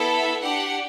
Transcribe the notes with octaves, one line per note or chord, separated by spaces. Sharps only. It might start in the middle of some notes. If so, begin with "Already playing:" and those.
Already playing: B3 E4 A4
E5
D4 G4 F#5